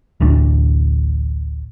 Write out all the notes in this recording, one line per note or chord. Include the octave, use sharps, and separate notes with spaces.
D1 A1 D2 D4